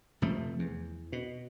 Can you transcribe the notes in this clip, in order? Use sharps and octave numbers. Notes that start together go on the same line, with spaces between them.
F1 C3 F3 A3
E2
B2